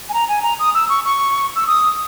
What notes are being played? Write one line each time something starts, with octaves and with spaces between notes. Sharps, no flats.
G#5
A#5
G#5
A#5
D#6
E6
C#6
C#6
E6
D#6